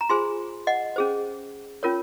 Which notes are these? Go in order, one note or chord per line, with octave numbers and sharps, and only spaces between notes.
A#5
F4 G#4 C5 G#5 C6
D#5 F#5
C#4 G#4 C5
C#4 F4 A#4 C#5